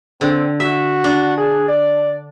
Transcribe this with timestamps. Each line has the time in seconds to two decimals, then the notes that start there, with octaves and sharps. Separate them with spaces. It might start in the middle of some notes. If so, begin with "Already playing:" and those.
0.21 D3 C4
0.60 F#4 E5
1.04 D4
1.37 G#4
1.68 D5